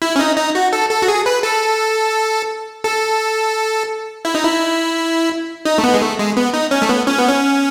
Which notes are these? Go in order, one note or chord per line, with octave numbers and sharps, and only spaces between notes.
E4
C#4
D#4
D#4
F#4
A4
A4
F#4
G#4
B4
A4
A4
E4
D#4
E4
D#4
A3
B3
G#3
A3
G#3
B3
D#4
C#4
A3
B3
C#4
B3
C#4